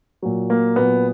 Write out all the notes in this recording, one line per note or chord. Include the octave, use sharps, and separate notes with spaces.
A#2 F#3
A#3
A#2 F#3 B3